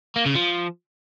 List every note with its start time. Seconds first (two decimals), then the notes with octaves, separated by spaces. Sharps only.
0.16 A#3
0.26 C#3
0.35 F3